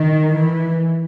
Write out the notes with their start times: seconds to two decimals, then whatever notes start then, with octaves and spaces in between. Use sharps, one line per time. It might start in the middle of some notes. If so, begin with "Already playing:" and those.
Already playing: D#3
0.35 E3